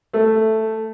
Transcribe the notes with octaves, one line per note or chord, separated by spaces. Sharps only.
A3